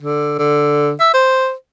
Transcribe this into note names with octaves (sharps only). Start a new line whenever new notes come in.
D3
D3
E5
C5